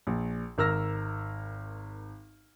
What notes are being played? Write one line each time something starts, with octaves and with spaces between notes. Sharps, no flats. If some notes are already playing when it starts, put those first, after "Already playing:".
A#1
G#1 A#4 E6 F6 A#6